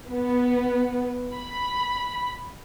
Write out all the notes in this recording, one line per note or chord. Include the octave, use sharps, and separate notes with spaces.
B3
B5